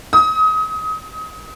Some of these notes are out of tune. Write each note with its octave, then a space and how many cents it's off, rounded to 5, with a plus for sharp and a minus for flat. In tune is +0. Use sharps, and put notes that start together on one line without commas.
D#6 +30